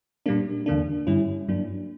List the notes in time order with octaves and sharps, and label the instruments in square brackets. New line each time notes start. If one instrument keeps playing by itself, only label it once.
[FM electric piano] A#2 G3 A#3 D4
E2 D3 A#3 D4
G2 D3 G3 C#4 E4
G2 F#3 A#3 D4